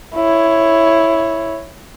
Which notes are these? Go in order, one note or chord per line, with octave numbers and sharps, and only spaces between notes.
E4 C#5